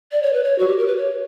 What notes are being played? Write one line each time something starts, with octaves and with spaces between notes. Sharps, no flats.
D5
C#5
B4
C#5
F#4
G4
A#4
B4
C#5